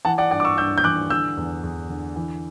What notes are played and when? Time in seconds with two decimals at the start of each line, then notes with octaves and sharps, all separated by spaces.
0.05 E3 F#5 A5
0.18 D5 F#5
0.31 G2 D5 F#5
0.40 D6
0.45 C#6 E6
0.58 G2 E6 G6
0.78 G6
0.84 E3 D6 F#6
1.10 D3 E6 G6
1.37 E2
1.63 E2
1.89 D3
2.16 E3